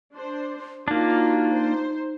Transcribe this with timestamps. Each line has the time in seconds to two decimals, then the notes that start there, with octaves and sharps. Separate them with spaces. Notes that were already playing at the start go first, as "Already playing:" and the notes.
0.14 D4 C5
0.88 A#3 D4 D#4 F4 F#4
1.53 C5